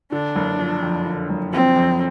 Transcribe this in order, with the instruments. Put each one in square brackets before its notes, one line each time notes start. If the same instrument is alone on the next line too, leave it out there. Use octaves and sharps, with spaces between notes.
[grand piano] D3 [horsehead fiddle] D4
[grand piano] F#1
F3
F2
D3
F#1
[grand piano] F3 [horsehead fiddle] C4
[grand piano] F2